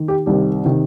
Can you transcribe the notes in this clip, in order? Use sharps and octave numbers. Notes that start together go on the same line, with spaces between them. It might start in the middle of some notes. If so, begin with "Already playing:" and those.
Already playing: D#3
G4
C2 C3 D#3 G4
C3 D#3